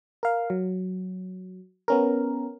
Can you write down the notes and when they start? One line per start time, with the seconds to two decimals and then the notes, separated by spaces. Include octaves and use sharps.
0.23 A#4 F5
0.50 F#3
1.88 B3 C#4 A#4